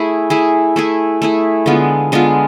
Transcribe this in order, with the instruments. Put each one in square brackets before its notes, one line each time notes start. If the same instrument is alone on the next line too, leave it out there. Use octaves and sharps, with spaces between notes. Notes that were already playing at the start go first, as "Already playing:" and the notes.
Already playing: [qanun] A3 E4 G#4
A3 E4 G#4
A3 E4 G#4
A3 E4 G#4
D3 G#3 B3 F4
D3 G#3 B3 F4